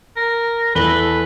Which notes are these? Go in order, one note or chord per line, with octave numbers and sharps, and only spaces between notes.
A#4
E2 E3 A4 B4 G7